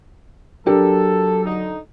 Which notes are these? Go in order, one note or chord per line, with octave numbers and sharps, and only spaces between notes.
F#3 D4 G4 A4 A#4
D3 D#4